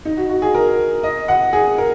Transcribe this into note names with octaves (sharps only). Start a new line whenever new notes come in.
D#4
F#4
F#4
G#4
A#4
D#5
F#5
G#4
A#4